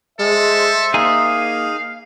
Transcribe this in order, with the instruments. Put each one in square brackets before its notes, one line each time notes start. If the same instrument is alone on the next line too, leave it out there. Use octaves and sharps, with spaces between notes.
[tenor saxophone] G#3 [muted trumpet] A4 [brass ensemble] C5 E5
[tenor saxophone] A#3 [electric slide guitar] D#4 G#4 [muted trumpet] F5